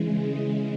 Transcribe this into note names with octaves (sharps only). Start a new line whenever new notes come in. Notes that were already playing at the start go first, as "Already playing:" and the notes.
Already playing: C#3 E3 G#3